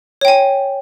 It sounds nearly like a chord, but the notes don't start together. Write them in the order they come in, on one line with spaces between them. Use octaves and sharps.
C#5 G5 G#5